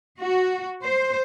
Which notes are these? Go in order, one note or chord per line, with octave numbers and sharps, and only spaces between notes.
F#4
C5